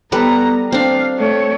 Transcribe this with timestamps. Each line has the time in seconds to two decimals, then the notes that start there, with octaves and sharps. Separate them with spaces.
0.12 G3 B3 A4 B4 A#5
0.72 C4 D4 F5
1.18 A3 C#5